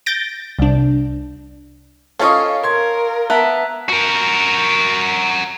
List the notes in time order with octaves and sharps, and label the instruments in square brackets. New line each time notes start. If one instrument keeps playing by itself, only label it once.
[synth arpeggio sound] G6 A6 A#6 D7
C2 D4
[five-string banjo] C#4 F4 [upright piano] A4 C#5 D#5 [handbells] F5
[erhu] A#4 [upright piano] C6 G#6
[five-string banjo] B3 [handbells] E5 A5 A#5
[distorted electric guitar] F#4 A#4